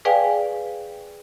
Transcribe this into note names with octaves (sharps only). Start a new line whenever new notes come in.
G#4 B4 D5 F5 G5 G#5